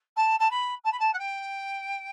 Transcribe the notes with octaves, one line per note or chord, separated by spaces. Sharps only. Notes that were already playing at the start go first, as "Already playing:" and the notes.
A5
A5
B5
A5
B5
A5
F#5
G5